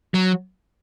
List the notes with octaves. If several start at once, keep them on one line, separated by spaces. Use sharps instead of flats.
F#3